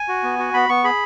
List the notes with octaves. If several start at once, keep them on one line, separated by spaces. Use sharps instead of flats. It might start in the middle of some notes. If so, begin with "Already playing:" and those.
Already playing: G#5
F#4
B3
F#4
B3 B5
B3 C#6
G#4 B5